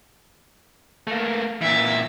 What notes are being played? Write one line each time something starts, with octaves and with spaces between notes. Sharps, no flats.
A3 A#3
A#2 E3 E5 A6